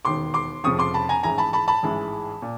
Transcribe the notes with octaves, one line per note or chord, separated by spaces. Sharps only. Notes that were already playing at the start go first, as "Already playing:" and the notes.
E1 D#2 D#3 C6 D6
C6 D6
F1 F2 C#3 F3 C#6 D#6
C6 D6
A5 B5
G#5 A#5
A1 G#2 E3 G#5 A#5
A5 B5
A5 B5
A5 B5
A1 G#2 E3 G#3
A#2